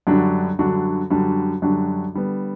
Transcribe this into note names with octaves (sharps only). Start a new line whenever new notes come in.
F#2 D3 G3 D4 F#4
F#2 D3 G3 D4 F#4
F#2 D3 G3 D4 F#4
F#2 D3 G3 D4 F#4
D3 G3 B3